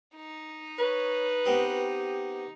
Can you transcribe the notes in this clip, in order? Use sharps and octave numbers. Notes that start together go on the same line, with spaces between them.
D#4
B4 C#5
B3 C4 G4 D#5